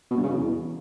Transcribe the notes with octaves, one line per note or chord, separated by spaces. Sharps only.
B2
G2
C#3
B2
E2